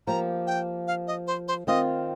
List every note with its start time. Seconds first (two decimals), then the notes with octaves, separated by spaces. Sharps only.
0.07 F3 A#3 G4 A#5
0.47 G5
0.87 F5
1.07 D#5
1.27 C5
1.48 C5
1.67 D#3 C4 F4 D#5